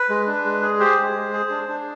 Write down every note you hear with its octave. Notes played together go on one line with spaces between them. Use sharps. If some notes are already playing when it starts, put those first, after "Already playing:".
Already playing: B4
G#3
D4
G#3
G#4
G4 C5
G#3
G#3
G#4
D4
D4